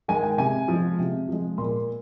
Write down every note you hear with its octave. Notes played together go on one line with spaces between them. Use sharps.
D#3 G#3 G#5
G5
C3 G#5
F3
G#3
C3
F3 G#3
A#2 C6